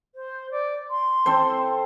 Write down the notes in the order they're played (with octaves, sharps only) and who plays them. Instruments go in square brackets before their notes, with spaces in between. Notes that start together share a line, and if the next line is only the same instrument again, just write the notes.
[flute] C5
D5
C6
[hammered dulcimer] C4 A4 C5